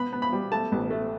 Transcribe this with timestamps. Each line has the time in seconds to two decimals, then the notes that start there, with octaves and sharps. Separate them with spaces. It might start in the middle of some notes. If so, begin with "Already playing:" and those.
Already playing: B3 B5
0.13 B3
0.22 B5
0.32 G3
0.52 A3 A5
0.72 A1
0.91 A3